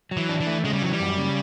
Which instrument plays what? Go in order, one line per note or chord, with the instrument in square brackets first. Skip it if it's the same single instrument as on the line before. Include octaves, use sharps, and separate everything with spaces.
[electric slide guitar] F#3
[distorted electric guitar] E3
[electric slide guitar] D4
[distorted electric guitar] E3
[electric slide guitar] A3
[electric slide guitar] C#3 [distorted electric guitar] G#3
[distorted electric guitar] G3
[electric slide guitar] E3 [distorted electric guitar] F#3
[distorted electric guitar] G3
[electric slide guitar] F#2
C#3